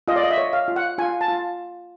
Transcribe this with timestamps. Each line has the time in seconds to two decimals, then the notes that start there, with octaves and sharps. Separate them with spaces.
0.08 F4 D#5
0.16 D5
0.23 D#5
0.31 E5
0.38 C#5
0.53 F5
0.68 F4
0.76 F#5
0.98 F4 G#5
1.21 A5
1.28 F4